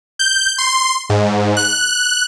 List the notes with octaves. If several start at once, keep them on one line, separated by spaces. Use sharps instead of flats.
G6
C6
G#2
F#6